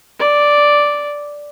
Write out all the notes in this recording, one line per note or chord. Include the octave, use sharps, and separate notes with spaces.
D5